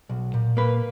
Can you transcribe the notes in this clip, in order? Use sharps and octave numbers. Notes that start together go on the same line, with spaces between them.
B1
A#2
A#3 B4